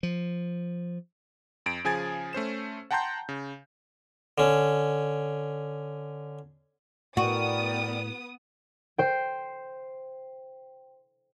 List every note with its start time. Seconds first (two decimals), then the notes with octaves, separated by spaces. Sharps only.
0.03 F3
1.66 F2 D7
1.84 C#3 F3 G#4 G#5 G#6 A6
2.33 A3 C#4 C5 E7
2.91 F#5 G5 A5 A#5 C6 G6
3.29 C#3
4.38 D3 C#4
7.17 A2 B3 F#4 A#4 D5 G5 D#6
8.98 C5 G5